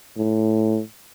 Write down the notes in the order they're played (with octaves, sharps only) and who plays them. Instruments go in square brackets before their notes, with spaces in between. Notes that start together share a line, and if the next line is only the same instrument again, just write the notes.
[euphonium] A2